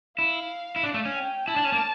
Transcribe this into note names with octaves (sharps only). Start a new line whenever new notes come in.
E4 F5
E4
D4
A3
C#4
G5
E4 A5
D4
C#4
A#3